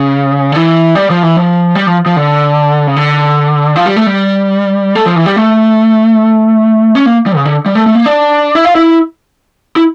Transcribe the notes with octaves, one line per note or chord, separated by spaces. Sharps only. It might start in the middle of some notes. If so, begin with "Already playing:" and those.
Already playing: C#3
D3
E3
G3
F3
E3
F3
G3
F3
F3
D3
C#3
D3
F3
G3
A3
G3
A3
F3
E3
G3
A3
C#4
A#3
G3
C#3
D3
G3
A3
A3
A#3
D4
E4
F4
E4
E4